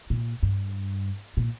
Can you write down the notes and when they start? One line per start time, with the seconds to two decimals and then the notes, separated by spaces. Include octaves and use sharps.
0.10 A#2
0.43 G2
1.37 A#2